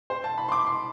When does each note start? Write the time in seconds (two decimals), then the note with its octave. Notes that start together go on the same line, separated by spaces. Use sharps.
0.10 C5
0.24 A5
0.38 B5
0.48 C6
0.52 D6
0.66 C6